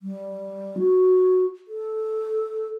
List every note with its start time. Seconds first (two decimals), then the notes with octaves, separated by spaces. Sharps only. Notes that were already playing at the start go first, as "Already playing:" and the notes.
0.01 G3
0.78 F#4
1.68 A4